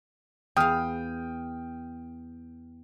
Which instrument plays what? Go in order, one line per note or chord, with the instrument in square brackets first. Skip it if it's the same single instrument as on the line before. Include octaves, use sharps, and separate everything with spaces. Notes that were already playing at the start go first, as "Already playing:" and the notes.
[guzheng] E2 F5 [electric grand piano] G5 D#6 F6